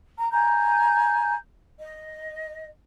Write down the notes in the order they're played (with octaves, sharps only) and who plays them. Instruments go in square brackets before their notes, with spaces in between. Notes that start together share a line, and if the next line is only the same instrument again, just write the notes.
[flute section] A#5
G#5 A#5 G6
D#5